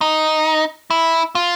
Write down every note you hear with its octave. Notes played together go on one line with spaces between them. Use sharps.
D#4
E4
F4